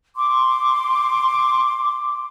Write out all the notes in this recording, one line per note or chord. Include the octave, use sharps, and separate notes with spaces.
C6 D6